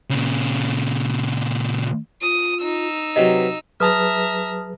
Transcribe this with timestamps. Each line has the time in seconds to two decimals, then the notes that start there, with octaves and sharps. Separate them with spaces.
0.10 A#2 C#3
2.22 F4 D#6
2.61 D#4 E6
3.16 C3 F#3 B4 D#5
3.80 F#3 G#4 B4 E5 A5 A#5 D#6 F6